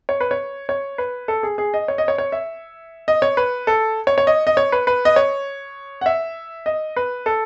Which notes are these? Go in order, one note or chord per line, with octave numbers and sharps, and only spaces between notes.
C#5
B4
C#5
C#5
B4
A4
G#4
G#4
D#5
C#5
D#5
C#5
C#5
E5
D#5
C#5
B4
A4
C#5
C#5
D#5
D#5
C#5
B4
B4
D#5
C#5
F#5
E5
D#5
B4
A4